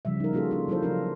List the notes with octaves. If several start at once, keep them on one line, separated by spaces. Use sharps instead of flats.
C#3 F3 G3 E5
D#4 A#4
A#3 C#4 F4 F#4 G#4 A4
D4 F4
F3 F#3 E4 F4 A4 C5
C#3 D4 F4 A#4